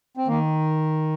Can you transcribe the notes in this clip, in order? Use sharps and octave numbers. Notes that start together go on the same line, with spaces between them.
C4
D#3 A#3